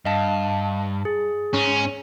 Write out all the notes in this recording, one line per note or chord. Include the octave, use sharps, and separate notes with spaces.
G2 D#5 F5 A5
G#4
G#2 C#4